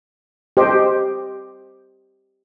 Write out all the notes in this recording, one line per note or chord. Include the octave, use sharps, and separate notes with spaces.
G4 C5 D#5